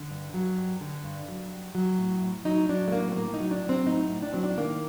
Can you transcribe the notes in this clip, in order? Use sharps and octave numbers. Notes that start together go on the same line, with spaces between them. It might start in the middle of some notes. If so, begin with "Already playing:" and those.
Already playing: D3
G2
F#3
G2
D3
G2
F#3
G2
F#3
A2
A2
F#3 D#4
F#3 D4
A3
A2 A#3
C4
A2 A#3
D#4
F#3
D4
F#3
C4
A2 D#4
A2
D4
F#3 C4
D4
D#3 A#3